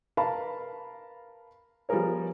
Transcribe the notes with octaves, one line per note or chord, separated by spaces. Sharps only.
A#4 B4 F5 A5 B5
F3 G3 B3 G#4 A#4 C#5